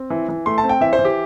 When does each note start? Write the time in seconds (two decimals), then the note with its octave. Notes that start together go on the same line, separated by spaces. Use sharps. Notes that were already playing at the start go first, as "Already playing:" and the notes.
Already playing: C4
0.10 E3
0.29 E3
0.46 A3 C6
0.58 A5
0.63 C4
0.69 G5
0.81 E3 E5
0.93 C5
0.99 E3
1.05 G4